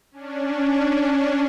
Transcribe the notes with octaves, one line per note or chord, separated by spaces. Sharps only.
C#4 D4